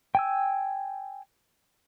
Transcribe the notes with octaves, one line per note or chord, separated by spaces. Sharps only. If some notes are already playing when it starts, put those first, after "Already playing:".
G5 G#5 E6